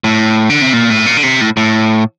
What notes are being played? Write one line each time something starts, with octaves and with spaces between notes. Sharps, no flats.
A2
D3
C3
A#2
A2
A#2
D3
C3
A2
A2